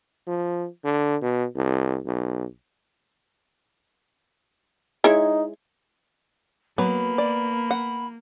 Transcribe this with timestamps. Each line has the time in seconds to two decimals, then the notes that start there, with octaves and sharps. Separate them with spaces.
0.27 F3
0.84 D3
1.21 B2
1.56 C2
2.06 B1
5.04 G#3 D#4 E4 C#5
6.78 F#3 A#3 B3 B5
7.18 D5
7.71 F#5